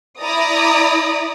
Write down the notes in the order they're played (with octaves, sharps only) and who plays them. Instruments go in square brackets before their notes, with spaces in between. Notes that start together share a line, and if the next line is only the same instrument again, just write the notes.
[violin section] E4 D5 A#5 D#6